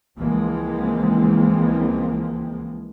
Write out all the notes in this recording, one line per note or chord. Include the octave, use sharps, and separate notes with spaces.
C#2 E3 F3 G#3 A#3 C4